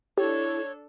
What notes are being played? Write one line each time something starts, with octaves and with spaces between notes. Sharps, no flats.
D4 E4 G4 A4 C#5